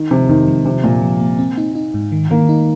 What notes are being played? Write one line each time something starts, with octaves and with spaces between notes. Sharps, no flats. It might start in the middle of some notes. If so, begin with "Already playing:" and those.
Already playing: D#3
C3 F3
F2 D#3
F3
C3 F3
A#2 F3
F3
A#3
C4
D#4
D#4
G#2
D#3
D#3 A#3
D#4